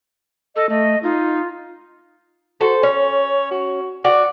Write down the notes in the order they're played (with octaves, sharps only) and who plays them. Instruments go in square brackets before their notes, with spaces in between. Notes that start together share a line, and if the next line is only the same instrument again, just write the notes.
[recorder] A4 [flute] D#5
[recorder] A3 [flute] D#5
[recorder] D#4 [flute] F4
[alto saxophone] F#4 [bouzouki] A4 C5
[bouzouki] C#4 [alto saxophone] C#5
[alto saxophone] F#4
[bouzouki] F#4 [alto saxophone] D5